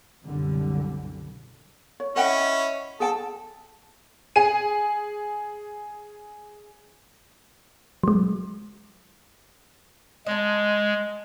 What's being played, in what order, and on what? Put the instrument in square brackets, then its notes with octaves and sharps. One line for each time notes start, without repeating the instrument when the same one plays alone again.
[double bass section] C2 F#2 B2 D3 G3
[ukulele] C#5
[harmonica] C#4 E4 [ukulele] D#5 F#5 G5
[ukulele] G#4 G5 A5 [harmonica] A4
[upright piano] G#4 D#7
[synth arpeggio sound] F#3 G#3
[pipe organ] G#3 [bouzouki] D#5 A5